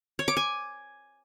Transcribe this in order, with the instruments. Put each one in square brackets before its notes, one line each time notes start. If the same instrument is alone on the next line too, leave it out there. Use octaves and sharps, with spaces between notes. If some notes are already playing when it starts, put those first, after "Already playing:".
[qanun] C#5
D6
G#5